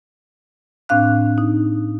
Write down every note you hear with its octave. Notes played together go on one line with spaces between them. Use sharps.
A2 C4 D4 F5 F#6
D#4